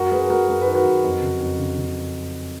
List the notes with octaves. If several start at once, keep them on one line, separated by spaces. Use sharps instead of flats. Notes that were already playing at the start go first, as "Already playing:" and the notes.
Already playing: F#2 F#4 A#4
F#2 G#4 B4
F#2 F#4 A#4
F#2 A#4
B4
D#3
F#4 A#4
F#2
F2
C#3
F2
C#3
C#3